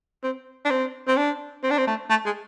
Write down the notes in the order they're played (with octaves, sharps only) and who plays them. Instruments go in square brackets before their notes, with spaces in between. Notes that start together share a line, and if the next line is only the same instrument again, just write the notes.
[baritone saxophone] C4
D4
C4
C4
D4
C4
D4
C4
A3
A3
G#3